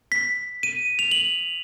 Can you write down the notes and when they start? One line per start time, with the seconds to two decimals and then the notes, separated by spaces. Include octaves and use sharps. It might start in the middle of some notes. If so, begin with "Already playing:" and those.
0.12 B6
0.63 D#7
0.99 F7
1.11 F#7